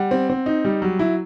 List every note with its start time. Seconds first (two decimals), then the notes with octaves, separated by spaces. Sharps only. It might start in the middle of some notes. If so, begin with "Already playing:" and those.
Already playing: G3 F#5
0.11 C4
0.30 C4
0.46 D#4
0.65 G3
0.82 F#3
0.99 E4